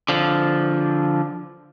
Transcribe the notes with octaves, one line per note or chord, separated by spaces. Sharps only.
D3 F3